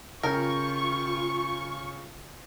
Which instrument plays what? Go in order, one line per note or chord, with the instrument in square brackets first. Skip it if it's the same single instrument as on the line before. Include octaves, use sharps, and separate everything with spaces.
[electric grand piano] C#3 G5 [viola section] F4 [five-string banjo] A#4 [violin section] C#6